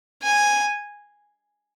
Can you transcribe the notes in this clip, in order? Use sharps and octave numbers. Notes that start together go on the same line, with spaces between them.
G#5